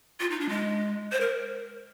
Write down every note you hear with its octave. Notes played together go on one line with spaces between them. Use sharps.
F4
D#4
D4
G#3
C5
A#4